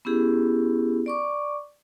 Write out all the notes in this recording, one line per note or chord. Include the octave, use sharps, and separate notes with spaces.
B3 C#4 E4 G4 G#4
D5 C#6 D6